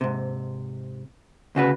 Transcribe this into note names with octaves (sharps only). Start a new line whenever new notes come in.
G#2 C3
D2 C#3 F#4 B4